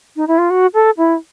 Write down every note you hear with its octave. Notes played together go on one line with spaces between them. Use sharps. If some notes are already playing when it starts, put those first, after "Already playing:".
D#4
E4
F4
F#4
A4
E4